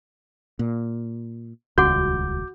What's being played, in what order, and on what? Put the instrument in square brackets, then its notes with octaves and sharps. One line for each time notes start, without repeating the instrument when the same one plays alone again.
[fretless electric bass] A#2
[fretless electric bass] D#1 C#2 [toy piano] F#4 F#5 [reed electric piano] D6 G6